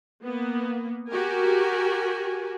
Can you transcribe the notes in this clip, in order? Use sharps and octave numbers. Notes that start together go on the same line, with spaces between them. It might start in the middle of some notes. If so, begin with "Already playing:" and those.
A#3 B3
F#4 G4 A#4 G#5